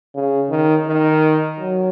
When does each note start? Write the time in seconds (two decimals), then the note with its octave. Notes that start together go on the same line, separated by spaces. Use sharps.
0.15 C#3
0.50 D#3
0.88 D#3
1.60 F#3